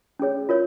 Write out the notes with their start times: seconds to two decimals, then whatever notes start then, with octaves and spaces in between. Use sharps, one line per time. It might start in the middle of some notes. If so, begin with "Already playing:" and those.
0.19 C#4 G#4 C#5
0.49 F4 A#4 C#5